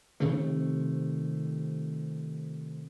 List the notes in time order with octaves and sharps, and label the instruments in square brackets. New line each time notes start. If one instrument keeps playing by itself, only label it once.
[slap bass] C3 D#3 F3 A3